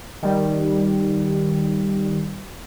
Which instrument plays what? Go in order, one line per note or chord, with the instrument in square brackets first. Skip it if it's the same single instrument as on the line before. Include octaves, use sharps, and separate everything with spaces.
[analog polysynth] D#3 G3